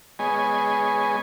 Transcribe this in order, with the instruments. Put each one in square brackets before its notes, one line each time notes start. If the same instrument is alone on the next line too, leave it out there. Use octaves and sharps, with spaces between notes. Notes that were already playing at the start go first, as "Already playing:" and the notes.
[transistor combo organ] G#3 B3 G#4 C#5 D#5 G#5